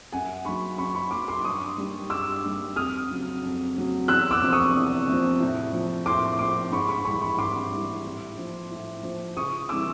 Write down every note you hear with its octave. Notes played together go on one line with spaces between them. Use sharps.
F#2 F#5 G#5
D#3 F#3 B5 C#6
F#2 B5 C#6
B5 C#6
D#3 F#3 C6 D6
C6 D6
G2 C#6 D#6
D#3 G3
G2 D6 E6
D#3 G3
F2 D#6 F6
C#3 F#3
F2
C#3 F#3
E2 E6 F#6
D6 E6
C3 F3
C#6 D#6
E2
C3 F3
A2
F3
A2 C6 D6
F3 C6 D6
G#2 B5 C#6
B5 C#6
E3 G3 B5 C#6
B5 C#6
G#2 C6 D6
E3 G3
A2
F3
A2
F3
C#2 C#6 D#6
C3 E3 G3 D6 E6